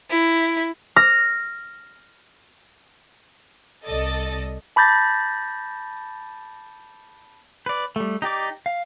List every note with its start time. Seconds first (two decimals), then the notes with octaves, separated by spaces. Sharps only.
0.10 E4
0.96 F6 A#6
3.85 C2 A4 D5 D#5 A6
4.76 A5 B5 D6 G6 A6 A#6
7.66 B4 D5
7.96 G3 A3
8.22 D#4 G4 D5 D6
8.66 F5